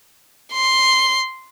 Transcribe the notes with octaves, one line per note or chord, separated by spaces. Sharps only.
C6